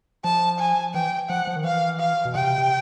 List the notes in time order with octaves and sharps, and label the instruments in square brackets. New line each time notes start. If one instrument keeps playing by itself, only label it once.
[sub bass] F3 [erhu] A5
[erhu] G#5
[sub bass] E3 [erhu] G5
[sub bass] F3 [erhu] F#5
[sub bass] F3
D#3
[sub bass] E3 [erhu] F5
[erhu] F5
[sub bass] B2
[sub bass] C3 [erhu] G5
[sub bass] C3